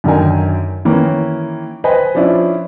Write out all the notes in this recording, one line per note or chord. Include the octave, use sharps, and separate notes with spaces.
F#2 D3 D#3 D#4 A#4 G#5
D#3 E3 A#3 C#4
B4 C5 D#5 G5 G#5 B5
F3 C#4 D4 E4 F4